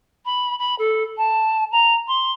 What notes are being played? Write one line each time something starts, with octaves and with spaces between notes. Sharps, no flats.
B5
B5
A4
A5
A#5
C6